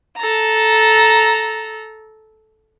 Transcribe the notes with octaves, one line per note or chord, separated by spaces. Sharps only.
A4 A#5